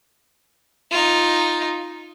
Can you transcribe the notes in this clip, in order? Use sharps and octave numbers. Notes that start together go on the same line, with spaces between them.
D#4 F4